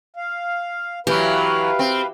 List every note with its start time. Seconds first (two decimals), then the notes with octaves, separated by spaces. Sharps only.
0.17 F5
1.07 E3 F#3 G4 B4 F5
1.79 C4